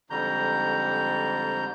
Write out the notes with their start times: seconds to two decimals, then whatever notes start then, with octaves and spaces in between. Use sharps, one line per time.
0.10 F2 G#2 D3 G3 A#5 G6